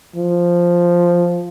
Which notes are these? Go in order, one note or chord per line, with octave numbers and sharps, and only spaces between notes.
F3